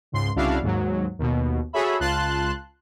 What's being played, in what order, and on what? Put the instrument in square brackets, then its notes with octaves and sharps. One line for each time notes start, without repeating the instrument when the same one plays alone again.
[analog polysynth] C#2 G#2 C6
C2 C#3 D4 E4 F#4 F5
D#2 G#2 F#3
D#2 B2
F#4 G#4 A4 C#5 E5 B5
C#2 F4 A5 C6 F#6